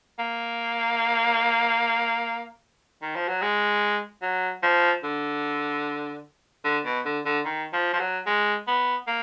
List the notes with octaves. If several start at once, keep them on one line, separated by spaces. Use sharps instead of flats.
A#3
D#3
F3
F#3
G#3
F#3
F3
D3
D3
B2
D3
D3
D#3
F3
F3
F#3
G#3
B3
A#3